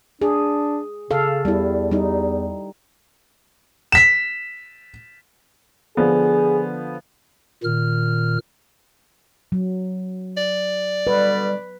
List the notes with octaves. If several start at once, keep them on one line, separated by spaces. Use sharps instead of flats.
D4 G#4
C#3 A4 F5
E2 G3 E4
G3 D#4
B6 E7
D3 F3 B3 G#4
A#2 D#3 F6
F#3
D5
B2 D3 G3 B4